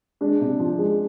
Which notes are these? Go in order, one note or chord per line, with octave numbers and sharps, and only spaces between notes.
G#3 D4
C3
F3
G#3